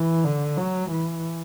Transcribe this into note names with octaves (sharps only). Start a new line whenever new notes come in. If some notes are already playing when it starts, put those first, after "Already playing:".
Already playing: E3
D3
F#3
E3